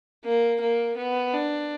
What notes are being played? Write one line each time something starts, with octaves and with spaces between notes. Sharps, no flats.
A#3
A#3
B3
D4